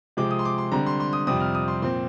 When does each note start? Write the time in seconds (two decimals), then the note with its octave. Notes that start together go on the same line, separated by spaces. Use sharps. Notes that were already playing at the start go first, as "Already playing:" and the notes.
0.17 C3 F3 G#3 C4 D6
0.31 D#6
0.39 C6
0.45 D6
0.58 C6
0.71 D3 G3 C4 A#5
0.86 C6
1.00 C6
1.13 D#6
1.27 F2 C3 G3 C4 D#6
1.40 F6
1.55 D#6
1.68 C6
1.82 A#2 F3 C4 C6